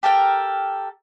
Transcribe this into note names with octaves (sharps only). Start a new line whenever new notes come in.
G4 A4 A#4 G5